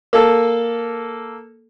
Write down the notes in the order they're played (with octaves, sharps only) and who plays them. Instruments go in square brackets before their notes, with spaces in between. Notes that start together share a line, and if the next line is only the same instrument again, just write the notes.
[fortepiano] A#3 A4